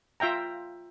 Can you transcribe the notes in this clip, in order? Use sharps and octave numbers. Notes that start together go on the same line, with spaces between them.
F4 E5 G5 A#5